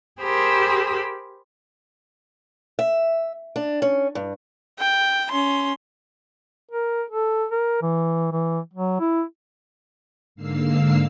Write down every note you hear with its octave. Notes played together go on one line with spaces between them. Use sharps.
G4 G#4 A#4 C5 B5 E6
E5
D4
C#4
G2
G5
C#4 C6
A#4
A4
A#4
E3
E3
F#3
E4
G#2 D3 A#3 F5 E6 C7